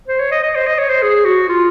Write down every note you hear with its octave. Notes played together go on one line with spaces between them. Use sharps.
C5
C#5
D#5
D#5
C5
D#5
C#5
C5
G#4
F#4
F4